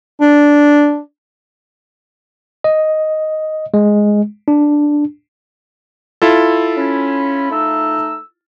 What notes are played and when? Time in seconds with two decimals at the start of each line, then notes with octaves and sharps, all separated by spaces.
0.21 D4
2.64 D#5
3.74 G#3
4.48 D4
6.22 E4 F4 A4
6.77 C#4 B5
7.51 A3 D#4 E6